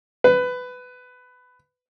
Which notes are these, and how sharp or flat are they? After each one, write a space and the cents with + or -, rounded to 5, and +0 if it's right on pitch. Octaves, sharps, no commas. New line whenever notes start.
B4 +15